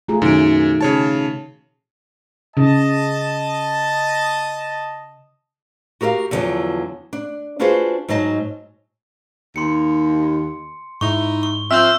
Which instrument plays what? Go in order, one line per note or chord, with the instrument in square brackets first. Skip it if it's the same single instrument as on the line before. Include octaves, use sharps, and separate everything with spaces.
[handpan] A3 F4 G#4 [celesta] A#5
[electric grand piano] F#2 [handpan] B2 D#3 [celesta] D#4 D7
[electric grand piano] C#3 C#5 A5
[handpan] C#3 [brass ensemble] D#5 A5
[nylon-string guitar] F#4 G4 A#4 E5 F5
E2 B2 D3 D#3 F3 F#3
D4
D4 F4 F#4 G#4 B4 C5
G#2 F#3 D#4 D#5 A5
[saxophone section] D#2 [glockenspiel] C6 C#7
[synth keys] G#2 [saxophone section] D#4 E4 [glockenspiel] C#6
[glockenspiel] C#6
[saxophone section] F3 C4 [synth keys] E5 F6 [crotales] E6 G6